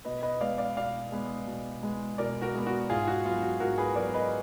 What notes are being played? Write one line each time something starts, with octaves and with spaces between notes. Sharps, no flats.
B2 B4 D#5
B4 D#5
G#3 B3 D5 F5
D5 F5
B2 D5 F5
G#3 B3
B2
G#3 B3
B2 A#4 D5
F#4 A#4
G#3 B3
F#4
G#2 F4 G#4
F#4
F#3 B3 F4
F#4
G#2 F#4 A#4
G#4 B4
F#3 B3 A#4 D5
B4 D#5